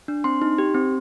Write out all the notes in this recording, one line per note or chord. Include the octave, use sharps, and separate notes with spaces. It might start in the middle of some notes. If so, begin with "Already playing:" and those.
D4
C4 C6
D#4
G4
C4